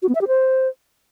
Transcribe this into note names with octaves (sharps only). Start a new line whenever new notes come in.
F#4
B3
E5
G4
C5